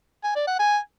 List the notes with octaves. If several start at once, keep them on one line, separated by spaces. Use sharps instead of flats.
G#5
D5
F#5
G#5